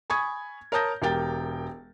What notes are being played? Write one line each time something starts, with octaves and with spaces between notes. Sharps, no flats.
G#5 B5 C#6 D#6 G#6
A#4 C#5 A5 D#6 G6 A#6
E1 G4 A#4 G5 A6